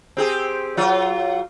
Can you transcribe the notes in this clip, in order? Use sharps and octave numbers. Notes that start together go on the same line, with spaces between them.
C4 G4 G#4
F#3 F4